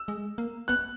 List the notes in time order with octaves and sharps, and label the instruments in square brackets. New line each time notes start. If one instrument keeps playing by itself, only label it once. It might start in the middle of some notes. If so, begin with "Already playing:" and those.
Already playing: [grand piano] E6
[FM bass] G#3
A#3
[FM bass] B3 [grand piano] F#6